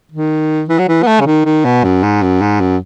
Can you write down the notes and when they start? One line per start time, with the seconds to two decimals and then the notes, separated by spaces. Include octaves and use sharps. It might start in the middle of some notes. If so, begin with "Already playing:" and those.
0.12 D#3
0.69 E3
0.79 F#3
0.88 E3
1.03 B3
1.07 A3
1.20 C#3
1.26 D#3
1.45 D#3
1.65 B2
1.84 F#2
2.03 G#2
2.22 F#2
2.41 G#2
2.60 F#2